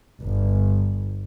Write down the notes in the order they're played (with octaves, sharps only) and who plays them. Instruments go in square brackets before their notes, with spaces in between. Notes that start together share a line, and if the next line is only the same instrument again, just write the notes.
[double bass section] G1